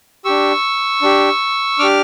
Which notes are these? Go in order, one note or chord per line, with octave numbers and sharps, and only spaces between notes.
D4 G4 C#6 E6
D4 G4
D4 G4 D6 F6